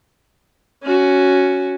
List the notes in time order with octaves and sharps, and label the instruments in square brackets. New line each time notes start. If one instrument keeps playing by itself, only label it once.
[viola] C#4 F#4